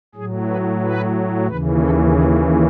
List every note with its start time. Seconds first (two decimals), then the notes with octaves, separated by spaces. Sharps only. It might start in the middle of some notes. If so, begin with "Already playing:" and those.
0.15 A2 F#3 G#4
0.47 B4
0.82 B4
1.47 D#2 C#3 E3 B4
1.80 A4
2.13 G#4